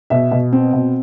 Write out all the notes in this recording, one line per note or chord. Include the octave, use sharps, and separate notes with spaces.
B2 E5
B2
C4
B2